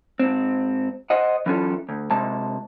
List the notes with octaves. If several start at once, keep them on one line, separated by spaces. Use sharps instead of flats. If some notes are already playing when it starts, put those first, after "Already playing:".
G#2 C4
C5 D#5 F#5
E3 F#3 C#4 F4 G#4 A4
D2
C3 G#3 A5